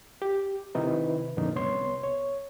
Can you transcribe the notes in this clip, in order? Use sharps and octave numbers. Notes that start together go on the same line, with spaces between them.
G4
C3 D#3 D#4 E4 B4
F2 A#2 D3 B3 C#4 D#4
C2 B3 C#5 C6
C#5